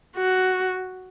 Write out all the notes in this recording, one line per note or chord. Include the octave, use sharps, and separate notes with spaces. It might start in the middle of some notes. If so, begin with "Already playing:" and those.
F#4